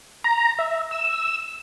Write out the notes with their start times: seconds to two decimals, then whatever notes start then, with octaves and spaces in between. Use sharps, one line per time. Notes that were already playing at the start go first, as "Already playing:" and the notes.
0.24 A#5
0.59 E5
0.91 E6